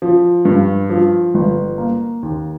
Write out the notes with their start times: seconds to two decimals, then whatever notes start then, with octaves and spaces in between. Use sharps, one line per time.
0.02 F3
0.45 G2
0.90 F3
1.35 G1
1.78 A#3
2.23 D#2